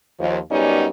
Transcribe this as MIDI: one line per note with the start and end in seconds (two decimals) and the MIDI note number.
0.19 0.39 39
0.19 0.39 53
0.51 0.88 42
0.51 0.88 55
0.51 0.88 59
0.51 0.88 61
0.51 0.88 63
0.51 0.88 74